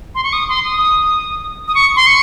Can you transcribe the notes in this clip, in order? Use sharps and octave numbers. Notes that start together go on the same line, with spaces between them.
C6
C#6
D#6
C6
D#6
D#6
C#6
C6
C#6